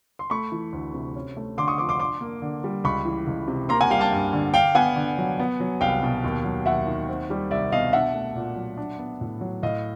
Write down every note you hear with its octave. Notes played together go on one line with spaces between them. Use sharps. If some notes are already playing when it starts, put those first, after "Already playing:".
C6
A3 B5 C#6
E3
D2
C3
C#4
A3
D3 C6 D6
C#6 D#6
F3 C6 D6
C6 D6
D4 C6 D6
A#3
D3
G3
C#2 B5 C#6
E3
C#2
C3
A#3 A#5 C6
F#5 G#5
G3 F5 G5
G5 A5
G2
D3
D4 F5 G5
B3 F#5 G#5
D3
F#3
B3
F#3
C2 F5 G5
B2
D#2
F#3
D#2 E5 F#5
D#3
C4
G3
C2 D5 E5
B2 D#5 F5
D4 E5 F#5
A3
A#2
F#3
D4
B3
A2
F#3
A2 D#5 F5